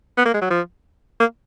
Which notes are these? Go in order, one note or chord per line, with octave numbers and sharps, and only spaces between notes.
B3
A#3
G#3
F#3
F3
A#3